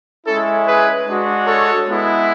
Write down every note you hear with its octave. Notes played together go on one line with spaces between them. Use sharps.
G#3 C#4 E4 A4
G#4 B4
G#3 D4 F#4
A4 C#5
G#3 B3 E4